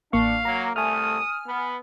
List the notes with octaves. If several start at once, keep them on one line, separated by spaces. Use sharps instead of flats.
A1 A#3 D4 F5 C#6
F#3 A#3 A#5
C2 A3 G#5 D#6 F6
B3